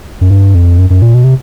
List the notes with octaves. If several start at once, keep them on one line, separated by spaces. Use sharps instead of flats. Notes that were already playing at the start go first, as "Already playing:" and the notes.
F#2
G2
F2
F#2
F#2
A#2
B2
C3